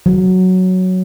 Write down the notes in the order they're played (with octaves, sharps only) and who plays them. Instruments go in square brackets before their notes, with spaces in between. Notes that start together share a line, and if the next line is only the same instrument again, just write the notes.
[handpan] F#3